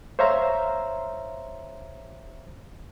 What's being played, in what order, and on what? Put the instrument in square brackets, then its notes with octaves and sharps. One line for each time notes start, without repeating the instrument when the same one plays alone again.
[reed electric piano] C5 C#5 E5 F5 A#5 C6